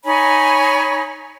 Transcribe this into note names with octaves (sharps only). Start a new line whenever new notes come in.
D#4 C#5 G#5 B5